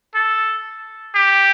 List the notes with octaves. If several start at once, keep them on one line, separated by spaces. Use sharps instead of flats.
A4
G4